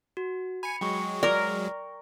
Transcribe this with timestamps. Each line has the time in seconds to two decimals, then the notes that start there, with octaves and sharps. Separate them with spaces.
0.17 F#4
0.63 G#5 B5 C#7
0.81 F#3 G#3 G5 C#6
1.23 A#4 D5 D6